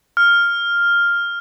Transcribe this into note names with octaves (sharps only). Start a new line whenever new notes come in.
F6